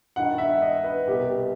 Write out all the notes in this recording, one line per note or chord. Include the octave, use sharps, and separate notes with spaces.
G2 D#3 F#5
E5
D#5
B4
C2 B2 G4